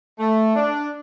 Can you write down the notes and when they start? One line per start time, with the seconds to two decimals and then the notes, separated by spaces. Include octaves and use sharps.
0.19 A3
0.56 D4